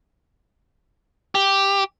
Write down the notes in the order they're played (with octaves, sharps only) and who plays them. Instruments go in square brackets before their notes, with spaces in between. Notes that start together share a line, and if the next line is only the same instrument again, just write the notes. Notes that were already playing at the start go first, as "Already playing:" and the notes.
[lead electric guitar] G4